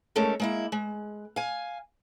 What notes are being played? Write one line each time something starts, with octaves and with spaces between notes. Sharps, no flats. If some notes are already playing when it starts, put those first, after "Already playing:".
G#3 A3 C#4 D#4 A4 A#4
G#3 A#3 E4
G#3
F5 G#5